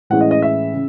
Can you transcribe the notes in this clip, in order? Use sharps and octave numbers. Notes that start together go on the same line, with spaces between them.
A2 E3 G#3 C#4 F#5
D#5
D#5
E5
C#3